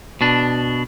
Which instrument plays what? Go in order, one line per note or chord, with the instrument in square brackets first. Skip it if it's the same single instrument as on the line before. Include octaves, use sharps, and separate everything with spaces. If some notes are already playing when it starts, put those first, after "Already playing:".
[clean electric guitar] B2 D4